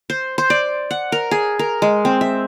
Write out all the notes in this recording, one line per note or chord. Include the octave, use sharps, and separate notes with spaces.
C5
C5
D5
F#5
A#4
G#4
A#4
G#3
C4
E5